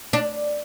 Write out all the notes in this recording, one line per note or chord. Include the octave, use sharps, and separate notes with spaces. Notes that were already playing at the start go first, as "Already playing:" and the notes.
D4